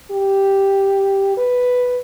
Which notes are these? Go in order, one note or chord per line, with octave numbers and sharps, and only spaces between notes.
G4
B4